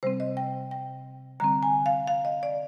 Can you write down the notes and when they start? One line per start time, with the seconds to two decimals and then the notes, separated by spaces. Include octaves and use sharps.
0.03 C3 G3 C4 C5
0.20 D#5
0.37 G5
0.71 G5
1.40 D3 G3 C4 A#5
1.63 G#5
1.86 F5
2.07 F5
2.25 D#5
2.43 D5